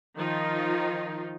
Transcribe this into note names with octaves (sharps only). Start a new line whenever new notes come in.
D#3 F3 D#4 F4